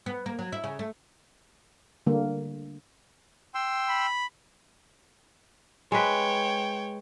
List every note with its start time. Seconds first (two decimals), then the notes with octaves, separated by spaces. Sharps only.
0.06 B3
0.26 A#3
0.39 F#3
0.52 E4
0.64 C#3
0.79 A3
2.07 D3 G3 A#3
3.54 G5 C6 E6
3.89 B5
5.92 G#3 B4 C#5 G5